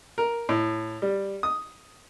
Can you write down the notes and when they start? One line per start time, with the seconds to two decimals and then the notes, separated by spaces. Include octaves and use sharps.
0.18 A#4
0.49 A2
1.02 G3
1.43 D#6